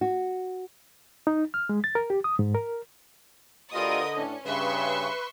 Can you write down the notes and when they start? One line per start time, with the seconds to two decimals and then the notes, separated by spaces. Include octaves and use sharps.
0.01 F#4
1.27 D#4
1.54 F6
1.69 G#3
1.84 A6
1.95 A#4
2.10 G4
2.24 D#6
2.39 G#2
2.55 A#4
3.73 D2 D3 F4 G4 A#4 B4 D#5 D#6
4.15 A2 C#4 D4
4.45 G2 C#3 B4 E5 C6 C#6